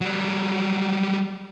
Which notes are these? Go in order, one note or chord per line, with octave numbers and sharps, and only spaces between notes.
F#3 G3